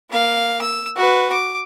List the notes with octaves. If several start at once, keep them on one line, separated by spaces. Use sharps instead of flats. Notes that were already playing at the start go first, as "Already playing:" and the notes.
A#3 F5
E6
F#4 B4
D6